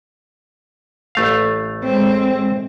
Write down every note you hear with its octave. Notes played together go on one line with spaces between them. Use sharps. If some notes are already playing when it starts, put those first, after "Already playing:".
A1 A3 F5
G#3 C4